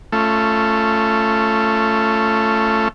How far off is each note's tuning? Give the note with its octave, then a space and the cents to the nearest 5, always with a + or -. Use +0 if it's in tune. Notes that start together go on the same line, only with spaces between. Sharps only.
A3 +0 C#4 +0 F4 -20